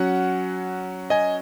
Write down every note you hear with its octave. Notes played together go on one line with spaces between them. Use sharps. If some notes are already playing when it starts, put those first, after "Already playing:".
Already playing: F#3 C#4 F#5
D#5 G#5